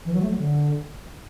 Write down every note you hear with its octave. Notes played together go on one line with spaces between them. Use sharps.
E3
F#3
A3
F#3
D3